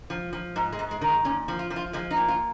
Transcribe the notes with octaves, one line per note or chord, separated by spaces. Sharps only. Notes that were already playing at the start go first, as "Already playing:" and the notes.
F3
F3
G#2
G#3
G#2
G#3
D#3
G#3
A#2 C#4
F3
F4
F3
F4
F3 G#3
D#4
A#2
F4